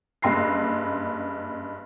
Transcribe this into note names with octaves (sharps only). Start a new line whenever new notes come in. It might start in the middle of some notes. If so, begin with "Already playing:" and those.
F#1 G2 C6 A#6 C7